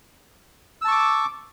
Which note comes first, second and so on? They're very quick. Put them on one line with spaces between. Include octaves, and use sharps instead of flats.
E6 A5 C#6 D6